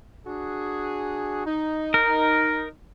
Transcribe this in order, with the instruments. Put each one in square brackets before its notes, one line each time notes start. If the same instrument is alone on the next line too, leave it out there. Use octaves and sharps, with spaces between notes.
[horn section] D4 F#4 G#4
D#4
[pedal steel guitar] A#4